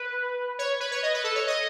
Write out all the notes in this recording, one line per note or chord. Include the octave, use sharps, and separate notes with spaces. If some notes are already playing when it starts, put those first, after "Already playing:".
Already playing: B4
C#5
B4
C#5
D#5
B4
A4
C#5
D#5